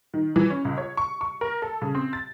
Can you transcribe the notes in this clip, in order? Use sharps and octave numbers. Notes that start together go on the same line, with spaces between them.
D#3
E3
C#4
C#2
C#5
C#6
C#6
A#4
A4
C#3
C4
A6